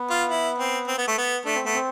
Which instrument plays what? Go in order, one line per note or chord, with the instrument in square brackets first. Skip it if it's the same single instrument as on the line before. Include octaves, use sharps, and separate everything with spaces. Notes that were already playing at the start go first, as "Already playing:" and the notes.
Already playing: [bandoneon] B3
[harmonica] F4
E4
C4
C4
B3
A3
B3
[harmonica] A3 [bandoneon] D4
[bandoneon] C4
[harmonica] A3 [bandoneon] B3
[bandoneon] C4